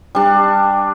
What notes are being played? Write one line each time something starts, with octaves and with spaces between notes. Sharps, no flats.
G3 D4